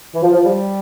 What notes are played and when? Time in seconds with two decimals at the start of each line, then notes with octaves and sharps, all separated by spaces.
0.14 E3
0.21 F3
0.33 F3
0.45 G3